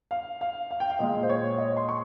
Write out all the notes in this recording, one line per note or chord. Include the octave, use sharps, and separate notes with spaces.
F5
F5
F5
G5
F5
A#2 G#3 D#5
C5
C#5
D#5
C6
C#6